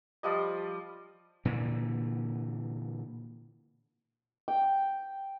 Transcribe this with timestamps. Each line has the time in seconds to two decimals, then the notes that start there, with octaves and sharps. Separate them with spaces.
0.23 F3 G3 D#5
1.45 A#2 D3 E3
4.48 G5